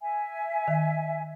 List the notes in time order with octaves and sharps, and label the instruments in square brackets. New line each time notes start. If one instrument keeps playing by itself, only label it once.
[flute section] E5 G#5
[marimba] D#3